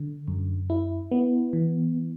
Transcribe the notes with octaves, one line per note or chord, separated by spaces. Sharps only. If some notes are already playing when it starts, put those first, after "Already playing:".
Already playing: D3
F#2
E4
B3
E3